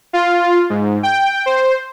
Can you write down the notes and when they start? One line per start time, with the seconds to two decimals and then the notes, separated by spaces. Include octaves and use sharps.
0.13 F4
0.70 G#2
1.03 G5
1.46 C5